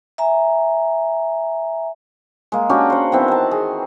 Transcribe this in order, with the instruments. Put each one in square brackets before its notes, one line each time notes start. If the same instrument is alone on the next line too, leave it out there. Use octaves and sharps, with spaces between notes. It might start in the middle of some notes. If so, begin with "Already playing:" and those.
[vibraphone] E5 G#5 A#5
[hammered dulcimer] G#3 A#3
C#4 D4 F#4 G4
C5 F#5
D#3 E3 B3 C4
A5 A#5
G#4